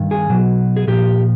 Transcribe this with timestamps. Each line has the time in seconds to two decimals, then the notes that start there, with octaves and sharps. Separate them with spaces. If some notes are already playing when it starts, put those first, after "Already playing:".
Already playing: G2 D#3
0.11 G#4
0.30 B2 F#3
0.77 G#4
0.87 A#2 F3 G4